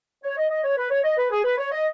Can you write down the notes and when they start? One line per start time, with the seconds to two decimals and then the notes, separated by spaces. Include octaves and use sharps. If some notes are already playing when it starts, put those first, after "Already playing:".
0.23 C#5
0.37 D#5
0.50 D#5
0.64 C#5
0.77 B4
0.91 C#5
1.04 D#5
1.17 B4
1.31 G#4
1.44 B4
1.58 C#5
1.72 D#5